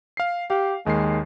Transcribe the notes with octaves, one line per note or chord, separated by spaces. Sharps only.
F5 C7
G4 F5
D#2 D#3 G#3 C7